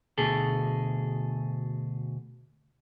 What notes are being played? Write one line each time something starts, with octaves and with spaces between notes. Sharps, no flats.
D2 B2 G#4 A4